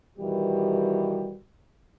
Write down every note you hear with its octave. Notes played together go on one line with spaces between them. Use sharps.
B2 D#3 E3 G3 F#4 G4